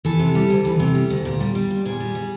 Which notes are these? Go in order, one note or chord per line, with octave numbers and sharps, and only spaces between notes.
E3 A4
C3
G3
D2
E3
C3
G3
D2
A#2
G3
G3
A#2
A#2 G#4
G3
G3